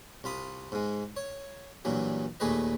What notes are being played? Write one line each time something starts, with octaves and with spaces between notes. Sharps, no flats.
C2 F4 B5 D#6
G#2 G#3
C#5
G2 A#2 E3 F#3
D#2 A#2 A3 G#4 B4 D#5